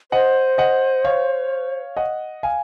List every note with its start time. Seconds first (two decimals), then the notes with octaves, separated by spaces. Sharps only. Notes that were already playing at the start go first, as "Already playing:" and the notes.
0.12 C5 D#5 F#5
0.58 D#5 F#5
1.05 C#5 F5
1.97 D#5 F#5
2.43 F5 G#5